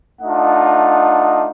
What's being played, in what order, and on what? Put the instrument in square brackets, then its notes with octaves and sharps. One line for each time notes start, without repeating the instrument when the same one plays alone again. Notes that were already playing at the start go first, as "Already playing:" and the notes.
[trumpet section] A3 D4 D#4 F4 D#5 F#5